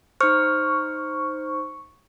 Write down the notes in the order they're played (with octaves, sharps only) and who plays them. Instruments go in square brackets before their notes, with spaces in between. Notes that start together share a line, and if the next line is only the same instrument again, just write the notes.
[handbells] D#4 C5 [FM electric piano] C#6 [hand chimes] F6